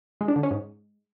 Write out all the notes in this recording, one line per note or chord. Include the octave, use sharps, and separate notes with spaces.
G#3
D4
D3
C#4
G#2